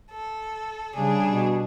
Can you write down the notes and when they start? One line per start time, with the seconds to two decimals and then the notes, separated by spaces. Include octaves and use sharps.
0.12 A4
0.95 C#3 G3 D4 G#4
1.26 B2